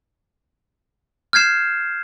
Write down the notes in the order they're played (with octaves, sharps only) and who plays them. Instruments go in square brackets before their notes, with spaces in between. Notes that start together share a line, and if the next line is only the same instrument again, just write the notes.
[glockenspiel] F6 G6 G#6 C7 E7